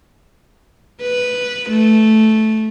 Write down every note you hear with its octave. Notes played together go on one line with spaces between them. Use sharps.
B4
A3